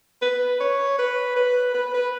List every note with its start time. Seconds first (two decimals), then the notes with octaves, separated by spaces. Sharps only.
0.22 B4
0.60 C#5
0.98 B4
1.36 B4
1.74 B4
1.94 B4